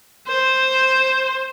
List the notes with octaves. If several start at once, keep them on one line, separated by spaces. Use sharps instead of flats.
C5